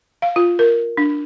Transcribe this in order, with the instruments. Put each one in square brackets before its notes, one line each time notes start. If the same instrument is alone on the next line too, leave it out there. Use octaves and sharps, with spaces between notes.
[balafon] F5
F4
A#4
D4